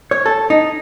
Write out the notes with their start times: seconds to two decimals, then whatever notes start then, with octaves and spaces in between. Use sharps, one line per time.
0.11 C#5
0.26 A4
0.50 D#4